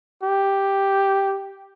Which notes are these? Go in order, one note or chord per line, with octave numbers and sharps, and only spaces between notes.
G4